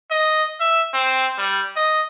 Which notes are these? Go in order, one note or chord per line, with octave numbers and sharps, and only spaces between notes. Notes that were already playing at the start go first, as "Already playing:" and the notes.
D#5
E5
C4
G3
D#5